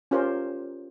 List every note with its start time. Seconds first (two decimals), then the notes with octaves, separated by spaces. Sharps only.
0.11 C#4 F4 G4 A#4 C5